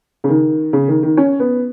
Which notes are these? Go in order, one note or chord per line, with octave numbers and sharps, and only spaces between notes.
C#3
D#3
C#3
D#3
D#3
C#4
B3